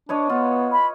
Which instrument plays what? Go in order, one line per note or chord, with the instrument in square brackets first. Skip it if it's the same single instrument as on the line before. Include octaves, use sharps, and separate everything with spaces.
[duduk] D4 [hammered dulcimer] B4 C#5 D#5
[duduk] B3 [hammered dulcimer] F4
[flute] B5